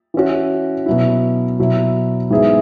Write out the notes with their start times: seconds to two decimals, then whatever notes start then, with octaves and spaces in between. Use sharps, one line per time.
0.14 E3 C#4 F#4
0.86 B2 F#3 E4
1.59 B2 F#3 E4
2.30 G#2 E3 B3 E4 G#4